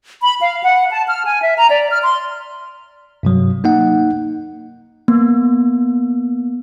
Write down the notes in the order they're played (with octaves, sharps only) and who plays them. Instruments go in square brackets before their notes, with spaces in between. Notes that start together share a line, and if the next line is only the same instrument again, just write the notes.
[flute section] B5
F5
F#5
A5
F6
G#5
E5
A#5
D5
F6
C6
[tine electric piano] G2 C3 F#3
A#3 D#4 F#5
[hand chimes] A#3 B3